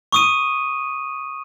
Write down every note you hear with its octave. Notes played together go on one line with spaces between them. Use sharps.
C#6 D#6 D#7